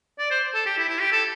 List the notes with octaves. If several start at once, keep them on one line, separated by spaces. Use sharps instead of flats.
D5
C5
A4
G4
E4
E4
G4
A4